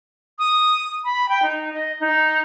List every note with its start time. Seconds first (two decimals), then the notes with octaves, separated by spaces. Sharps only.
0.39 D#6
1.05 B5
1.29 G5
1.43 D#4
1.73 D#5
2.00 D#4